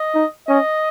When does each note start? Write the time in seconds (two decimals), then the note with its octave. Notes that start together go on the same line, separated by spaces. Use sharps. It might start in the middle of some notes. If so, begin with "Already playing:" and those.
Already playing: D#5
0.14 D#4
0.48 C#4 D#5